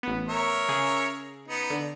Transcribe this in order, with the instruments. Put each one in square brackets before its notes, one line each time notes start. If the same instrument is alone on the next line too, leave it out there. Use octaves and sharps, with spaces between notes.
[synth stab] A1 B3
[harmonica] A#4 C#5 E5
[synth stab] C#3 G#4
[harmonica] B3 D#4
[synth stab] D3